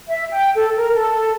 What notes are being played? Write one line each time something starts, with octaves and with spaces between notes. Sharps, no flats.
E5
G5
A4
A#4
A4